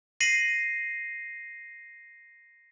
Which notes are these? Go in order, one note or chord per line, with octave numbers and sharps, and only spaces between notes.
A#6 C7 D#7 F#7